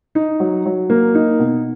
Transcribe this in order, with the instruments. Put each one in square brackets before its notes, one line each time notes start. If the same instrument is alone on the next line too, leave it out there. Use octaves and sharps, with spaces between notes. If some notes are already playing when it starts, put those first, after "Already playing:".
[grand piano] D#4
F#3
F#3
A#3
D#4
B2